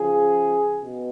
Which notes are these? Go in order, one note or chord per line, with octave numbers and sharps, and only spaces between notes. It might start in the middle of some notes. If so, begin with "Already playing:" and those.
Already playing: C#3 F3 G#4
B2